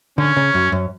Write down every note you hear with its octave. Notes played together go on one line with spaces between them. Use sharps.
D3 C#4
C#3
F#2
F#2